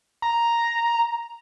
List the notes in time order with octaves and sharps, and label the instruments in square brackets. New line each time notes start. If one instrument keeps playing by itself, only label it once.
[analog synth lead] A#5